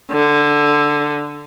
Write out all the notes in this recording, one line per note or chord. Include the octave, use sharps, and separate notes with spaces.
D3